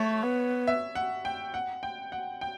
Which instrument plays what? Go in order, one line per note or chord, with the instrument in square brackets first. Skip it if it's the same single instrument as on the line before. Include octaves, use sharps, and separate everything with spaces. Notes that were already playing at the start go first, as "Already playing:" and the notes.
Already playing: [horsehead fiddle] A3 [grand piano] C#5
[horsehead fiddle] B3
[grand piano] E5
F#5
G5
F#5
G5
F#5
G5